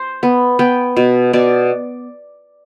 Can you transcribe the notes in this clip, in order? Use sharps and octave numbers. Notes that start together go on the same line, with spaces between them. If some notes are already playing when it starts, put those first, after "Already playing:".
Already playing: C5
B3
B3 G5
B2
B2 D5